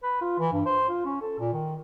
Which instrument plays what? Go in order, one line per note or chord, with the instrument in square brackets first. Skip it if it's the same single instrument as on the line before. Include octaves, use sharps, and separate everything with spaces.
[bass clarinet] B4
F4
E3
G2
C5
F4
C#4
A4
A#2
D#3